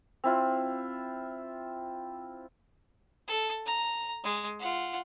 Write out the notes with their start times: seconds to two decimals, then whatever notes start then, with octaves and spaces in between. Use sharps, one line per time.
0.24 C4 E4 F4
3.28 A4
3.66 A#5
4.23 G#3
4.60 F4 F#5